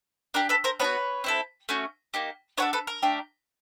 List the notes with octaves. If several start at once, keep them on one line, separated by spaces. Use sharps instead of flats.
D4 G4 A#4
A4 B4
A#4 C5
B3 D4 F#4 B4 C#5
C4 E4 A4
A3 C#4 F#4
A#3 D#4 G4
D4 F#4 A4 B4 C#5
A4 B4
A#4
A3 D4 G4